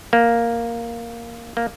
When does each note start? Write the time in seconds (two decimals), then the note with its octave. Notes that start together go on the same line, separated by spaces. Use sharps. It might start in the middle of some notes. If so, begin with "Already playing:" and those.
0.13 A#3
1.57 A#3